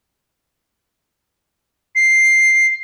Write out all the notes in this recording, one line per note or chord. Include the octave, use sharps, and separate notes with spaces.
C7